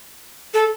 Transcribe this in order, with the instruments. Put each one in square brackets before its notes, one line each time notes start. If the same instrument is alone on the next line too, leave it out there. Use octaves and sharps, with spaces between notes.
[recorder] A4